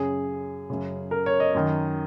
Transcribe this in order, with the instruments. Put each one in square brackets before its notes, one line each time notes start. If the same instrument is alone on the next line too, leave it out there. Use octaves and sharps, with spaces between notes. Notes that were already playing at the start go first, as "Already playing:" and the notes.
Already playing: [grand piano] F#2 C#3 G#4
F#2 C#3
A#4
C#5
D#5
F#2 D#3